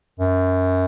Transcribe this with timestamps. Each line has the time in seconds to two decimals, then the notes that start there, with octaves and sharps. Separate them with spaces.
0.20 F#2